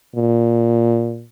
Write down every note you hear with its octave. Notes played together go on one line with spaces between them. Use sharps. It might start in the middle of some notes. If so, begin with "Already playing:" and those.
A#2